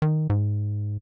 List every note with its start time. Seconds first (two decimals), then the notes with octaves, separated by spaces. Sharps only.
0.02 D#3
0.30 G#2